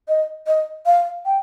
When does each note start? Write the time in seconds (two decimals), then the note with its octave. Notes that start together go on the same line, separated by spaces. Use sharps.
0.08 D#5
0.47 D#5
0.86 F5
1.26 G5